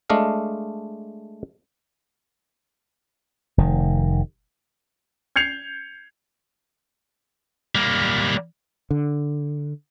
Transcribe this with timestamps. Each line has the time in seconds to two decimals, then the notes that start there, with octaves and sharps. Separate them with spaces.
0.10 G#3 A3 D4 D#5 F5
3.58 F1 D#3
5.36 G6 G#6 C7 C#7 F7
7.75 G3 A#3
8.91 D3